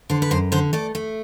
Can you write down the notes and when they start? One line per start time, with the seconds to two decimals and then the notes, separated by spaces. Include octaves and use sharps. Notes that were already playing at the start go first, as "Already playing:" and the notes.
0.10 D3 C5
0.22 B4
0.31 F#2 C5
0.52 D3 C5
0.73 A3 D5
0.95 A3